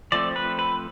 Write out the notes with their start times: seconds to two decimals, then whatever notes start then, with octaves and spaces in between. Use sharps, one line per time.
0.12 F3 A3 C4 D5
0.36 B4
0.59 B4